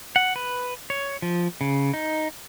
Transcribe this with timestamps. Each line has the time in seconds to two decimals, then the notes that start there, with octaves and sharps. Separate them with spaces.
0.16 F#5
0.36 B4
0.90 C#5
1.22 F3
1.61 C#3
1.94 D#4